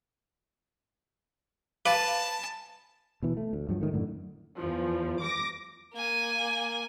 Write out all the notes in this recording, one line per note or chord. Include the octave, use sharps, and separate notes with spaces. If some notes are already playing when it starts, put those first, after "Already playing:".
B4 F5 A5 D6
B2 E3
A3
D2
G2 F3 F#3
G#2 D#3 A3
F#2 A2 D3
E2 F3
D6 A#6
A#3 G#5